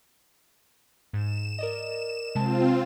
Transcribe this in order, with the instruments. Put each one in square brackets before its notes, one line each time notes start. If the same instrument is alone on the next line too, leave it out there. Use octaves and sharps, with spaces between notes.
[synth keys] G#2 [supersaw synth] E7
[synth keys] A#4 D5 D#5
[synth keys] C3 G#3 A5 [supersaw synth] C4 F4